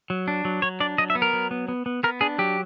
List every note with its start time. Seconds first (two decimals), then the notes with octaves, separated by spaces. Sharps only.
0.10 F#3
0.28 D4
0.45 F#3
0.62 F#3 C#5
0.80 D4 D5
0.98 F#3 D#5
1.10 E5
1.15 B3
1.22 A#4
1.33 F#3
1.51 B3
1.68 B3
1.86 B3
2.03 B3 A#4
2.21 D4 G#4
2.38 F#3 G4